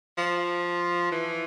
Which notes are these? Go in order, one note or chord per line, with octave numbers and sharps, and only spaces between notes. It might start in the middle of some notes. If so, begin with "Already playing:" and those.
F3
E3